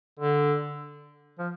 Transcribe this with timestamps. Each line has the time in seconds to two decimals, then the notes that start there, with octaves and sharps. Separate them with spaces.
0.19 D3
1.39 F3